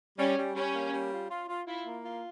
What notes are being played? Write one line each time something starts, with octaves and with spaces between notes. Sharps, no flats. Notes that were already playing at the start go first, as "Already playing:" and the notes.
G3 C#4
G3
G3 C#4
A#3
G3
F4
F4
F4
E4 F4
A#3
F4